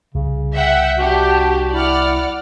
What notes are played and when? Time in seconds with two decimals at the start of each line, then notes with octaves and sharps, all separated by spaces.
0.15 C2 C#3
0.53 E5 F#5 G5
0.98 D4 F#4 G4
1.73 E4 D5 F#5 F6